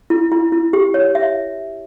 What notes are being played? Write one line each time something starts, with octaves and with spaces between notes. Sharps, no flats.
E4
E4
E4
G4
C#5
E5